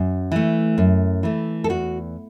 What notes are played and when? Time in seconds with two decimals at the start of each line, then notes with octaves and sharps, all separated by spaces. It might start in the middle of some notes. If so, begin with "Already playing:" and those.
Already playing: F#2
0.32 E3 A3
0.78 F#2
1.23 E3 A3
1.64 A4
1.69 E2 F#4